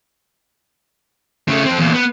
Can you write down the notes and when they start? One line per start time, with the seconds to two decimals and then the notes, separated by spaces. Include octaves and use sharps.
1.48 C#3 A3
1.65 F2 C4
1.79 E2 A#2
1.94 B3